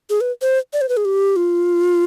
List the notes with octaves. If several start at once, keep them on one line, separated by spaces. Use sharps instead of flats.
G#4
B4
C5
D5
C5
B4
G#4
G4
F4